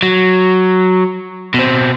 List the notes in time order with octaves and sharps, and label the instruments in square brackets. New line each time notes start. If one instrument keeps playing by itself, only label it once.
[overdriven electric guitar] F#3
B2 C4